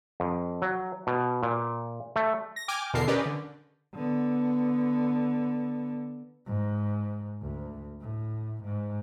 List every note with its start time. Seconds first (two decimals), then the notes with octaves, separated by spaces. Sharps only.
0.20 F2
0.62 F#3
1.07 B2
1.43 A#2
2.16 A3
2.56 A#6
2.68 G5 G#5 D6 F6
2.93 E2 B2 D3 A4 A#4 C7
3.07 C#4 G4 A#4 B4 D5 D#5
3.26 D3
3.95 D3 B3
6.46 G#2
7.42 D2
8.01 A2
8.65 G#2